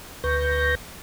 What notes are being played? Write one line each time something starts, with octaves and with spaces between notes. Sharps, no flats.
D2 B4 C#6 G6 A#6